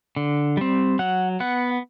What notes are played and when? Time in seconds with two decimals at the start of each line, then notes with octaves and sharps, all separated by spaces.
0.16 D3
0.57 G3 C4
0.99 F#3 F#5
1.40 B3 F#5